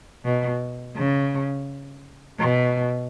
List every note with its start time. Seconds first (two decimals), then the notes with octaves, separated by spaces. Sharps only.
0.25 B2
0.96 C#3
2.39 B2